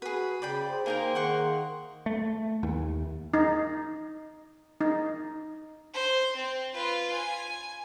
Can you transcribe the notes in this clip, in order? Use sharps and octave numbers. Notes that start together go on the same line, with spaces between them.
F#4 G#4 B4
C#3 D5 G5 B5
G#4 C5
A#3 D#4 G#4 A#4 G5
D#3 G#4 F#5 C6 C#6
A3
D#2
D#4
D#4
C5
C4
F4 B4
G#5